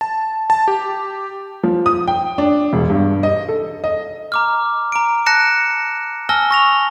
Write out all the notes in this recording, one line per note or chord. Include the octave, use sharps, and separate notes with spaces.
A5
A5
G4
F3
D#6
G5
D4
E1
G2
D#5
A4
D#5
A#5 D6 F6
A#5 D7
A5 F#6 A#6 C#7 E7
G#5 A5 E6 F6 A#6 G7
C#6 A#6 F7